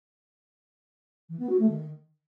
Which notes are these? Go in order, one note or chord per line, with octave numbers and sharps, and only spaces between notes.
E3
B3
F#4
A3
D#3